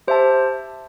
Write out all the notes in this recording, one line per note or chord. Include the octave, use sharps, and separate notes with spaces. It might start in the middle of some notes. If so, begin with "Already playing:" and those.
G4 C5 E5 A5